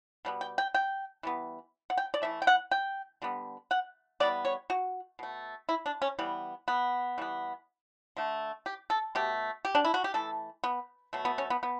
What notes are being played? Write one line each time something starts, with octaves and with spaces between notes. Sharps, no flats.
B2 G3 B3
G5
G5
G5
E3 G3 B3
F#5
G5
D5
E3 A3 E5
G5
F#5
G5
D3 G3 B3
F#5
E3 G3 B3 D5
C#5
F#4
B2 A3
E4
D4
C#4
E3 G3 B3
B3
E3 G3 B3
D3 A3
G4
A4
B2 A3 G4
G4
D4
E4
F#4
G4
E3 A3 A4
B3
B2 F#3 A3
B3
C#4
B3
B3